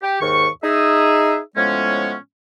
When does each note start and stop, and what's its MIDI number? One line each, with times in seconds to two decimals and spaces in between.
0.03 0.16 67
0.21 0.48 39
0.21 0.48 44
0.21 0.48 51
0.21 0.48 85
0.64 1.39 63
0.64 1.39 68
0.64 1.39 76
1.56 2.15 45
1.56 2.15 53
1.56 2.15 56
1.56 2.15 59
1.56 2.15 61